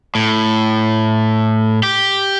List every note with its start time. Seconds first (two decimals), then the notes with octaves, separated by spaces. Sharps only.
0.15 A2
1.83 G4